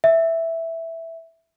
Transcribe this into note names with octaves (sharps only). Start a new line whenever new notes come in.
E5